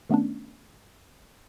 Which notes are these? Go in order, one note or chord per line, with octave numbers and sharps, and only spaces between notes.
D#3 A3 B3 C#4 D4